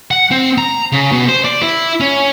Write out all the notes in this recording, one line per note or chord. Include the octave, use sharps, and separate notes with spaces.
F#5
C4
A#5
C#3
B2
C5
D5
E4
C#4